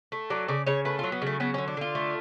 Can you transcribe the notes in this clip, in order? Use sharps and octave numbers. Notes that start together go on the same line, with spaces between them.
A3
F#3 D5
C#3 D5
C#3 C#5
A3 B4
F4
F#3
B3
C#3 A3
F#3 B3
D3 C#4
D4
D3 F4
A3